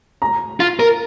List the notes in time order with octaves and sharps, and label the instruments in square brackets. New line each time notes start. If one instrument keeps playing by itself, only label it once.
[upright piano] A#5
[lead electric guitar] F4
A#4